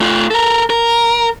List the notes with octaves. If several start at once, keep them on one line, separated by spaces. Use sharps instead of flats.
A3 F4
A4 A#4
A#4